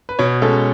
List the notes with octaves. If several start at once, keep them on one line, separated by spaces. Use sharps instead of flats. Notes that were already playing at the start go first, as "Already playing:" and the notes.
B4
B2 C#5
G#3 C#4 A4